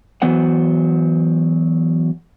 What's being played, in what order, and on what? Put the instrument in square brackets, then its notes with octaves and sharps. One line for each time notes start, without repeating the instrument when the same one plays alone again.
[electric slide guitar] E3 F#3 B3 C5 F#5